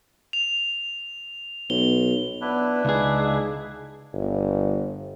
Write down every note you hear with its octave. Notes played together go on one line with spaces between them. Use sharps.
F7
B1 G7
B3 D4 E4 B4
C#2 D#4 G#4
G1